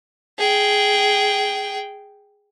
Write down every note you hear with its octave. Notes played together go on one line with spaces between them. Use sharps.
G#4 G5